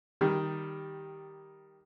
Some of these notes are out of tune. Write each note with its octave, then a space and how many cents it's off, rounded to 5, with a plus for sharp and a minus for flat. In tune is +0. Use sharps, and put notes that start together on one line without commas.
D#3 +0 G3 +0